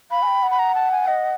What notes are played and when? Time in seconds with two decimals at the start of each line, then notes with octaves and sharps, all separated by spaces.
0.11 F5 B5
0.23 G#5
0.27 G5
0.43 F#5
0.51 B5
0.59 A#5
0.75 A5
0.92 G#5
1.07 D#5